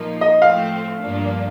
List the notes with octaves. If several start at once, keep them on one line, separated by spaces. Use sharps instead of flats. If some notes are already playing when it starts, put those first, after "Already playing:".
Already playing: A#2 F3 A#3 D#4
D#5
A2 F3 A3 C4 F5
G2 F3 A#3 D4